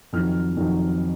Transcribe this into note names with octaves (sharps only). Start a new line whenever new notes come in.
F2 D#3 F#3 F6
F2 D#3 F#3